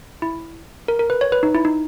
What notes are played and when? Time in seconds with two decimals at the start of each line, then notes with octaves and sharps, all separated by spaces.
0.22 E4
0.88 A#4
0.99 A#4
1.10 B4
1.21 C#5
1.32 B4
1.43 D#4
1.55 E4
1.65 D#4